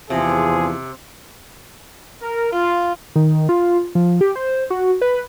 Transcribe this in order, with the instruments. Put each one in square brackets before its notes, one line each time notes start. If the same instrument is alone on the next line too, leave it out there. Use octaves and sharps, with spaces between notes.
[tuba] E2 [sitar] C3 [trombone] F3 [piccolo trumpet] G#4
[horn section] A#4
F4
[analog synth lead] D#3
F4
F3
G4
C5
F#4
B4